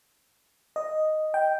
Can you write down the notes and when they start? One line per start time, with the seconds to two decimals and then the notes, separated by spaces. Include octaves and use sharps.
0.76 D#5
1.34 G5